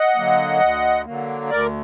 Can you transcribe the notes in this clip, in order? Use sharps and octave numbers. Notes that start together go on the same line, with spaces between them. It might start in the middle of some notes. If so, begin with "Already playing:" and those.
Already playing: D#5 F#5
D3 F#3 A#3
D2
D3 F#3 A#3
D2 A#4 D5